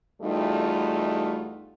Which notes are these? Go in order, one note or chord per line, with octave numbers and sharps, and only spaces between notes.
E2 G3 A3 D#4 F4 F#4